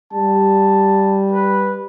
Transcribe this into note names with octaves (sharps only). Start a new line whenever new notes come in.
G3 A5
B4